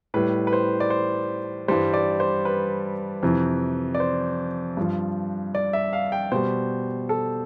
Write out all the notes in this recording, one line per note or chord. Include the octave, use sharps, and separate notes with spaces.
A2 G3 B4
B4
C5
D5
C5
G2 E3 G3 C5
D5
C5
B4
F2 C3 E3
D5
C5
G2 F3
D5
E5
F5
G5
B2 G3 C5
A4